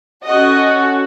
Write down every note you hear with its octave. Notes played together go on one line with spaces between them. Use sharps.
C#4 F#4 A4 D#5